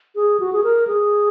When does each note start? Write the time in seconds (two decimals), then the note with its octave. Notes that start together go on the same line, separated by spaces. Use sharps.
0.16 G#4
0.40 F#4
0.53 G#4
0.64 A#4
0.87 G#4